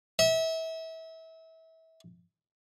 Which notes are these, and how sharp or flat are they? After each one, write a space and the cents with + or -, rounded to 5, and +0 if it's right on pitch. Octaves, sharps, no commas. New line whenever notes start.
E5 -30